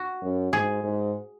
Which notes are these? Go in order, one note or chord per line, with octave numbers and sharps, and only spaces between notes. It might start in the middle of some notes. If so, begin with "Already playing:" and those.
Already playing: F#4
F#2
G#2 G#4
G#2